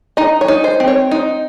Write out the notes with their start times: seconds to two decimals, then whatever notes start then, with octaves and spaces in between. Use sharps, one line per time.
0.17 D#4 D#5
0.41 C#5
0.48 D#4
0.64 C5
0.80 C4
0.88 C#5
1.11 D#4